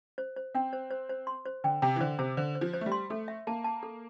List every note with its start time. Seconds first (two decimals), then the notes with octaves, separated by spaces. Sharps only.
0.18 C5
0.36 C5
0.54 C4 G5
0.73 C5
0.91 C5
1.09 C5
1.27 C6
1.46 C5
1.64 D3 G5
1.82 C3 G5
1.96 E3
2.00 D3 C5
2.19 C3 C5
2.37 D3 C5
2.55 C5
2.61 F3
2.74 C5
2.81 A3
2.86 G3
2.92 C6
3.10 A3 A4
3.28 E5
3.47 A#3 A5
3.64 A5
3.83 A4